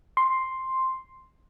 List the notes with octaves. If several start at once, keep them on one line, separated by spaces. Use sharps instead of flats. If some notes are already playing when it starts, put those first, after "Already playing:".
C6